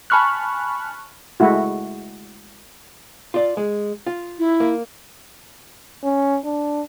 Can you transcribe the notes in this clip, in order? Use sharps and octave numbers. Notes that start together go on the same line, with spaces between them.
G#5 A5 B5 C#6 F6 F#6
G#3 A3 E4 F#4
F4 D5
G#3
F4
E4
A#3
C#4
D4